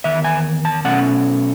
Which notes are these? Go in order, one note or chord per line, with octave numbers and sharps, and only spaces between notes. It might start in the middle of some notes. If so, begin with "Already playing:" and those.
E2 D#3 E5
G#5
A5
B2 F#3 A3 C#4 F#5